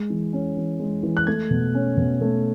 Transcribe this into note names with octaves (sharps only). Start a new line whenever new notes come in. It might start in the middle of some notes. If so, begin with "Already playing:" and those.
Already playing: G#3
E3
C#4
E3
G#3
E3
F#6
A3 G#6
B2
C#4
B2
A3